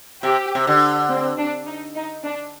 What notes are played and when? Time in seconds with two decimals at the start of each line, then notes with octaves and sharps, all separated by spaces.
0.23 C3 G4
0.55 C3
0.67 D3
1.09 C4
1.38 D4
1.67 D#4
1.96 D#4
2.24 D4